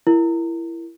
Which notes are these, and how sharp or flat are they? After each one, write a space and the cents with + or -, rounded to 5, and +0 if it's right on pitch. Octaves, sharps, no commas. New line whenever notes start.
E4 +20 A#4 +0